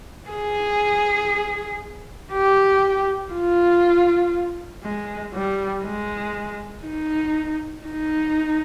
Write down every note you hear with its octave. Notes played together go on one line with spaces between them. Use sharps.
G#4
G4
F4
G#3
G3
G#3
D#4
D#4